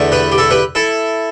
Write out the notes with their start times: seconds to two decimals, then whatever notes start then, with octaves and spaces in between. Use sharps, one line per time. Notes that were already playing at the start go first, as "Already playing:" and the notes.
Already playing: E2 D3 A3
0.12 G4 B4
0.32 G4
0.38 E4 A4
0.51 G4 B4
0.75 E4 A4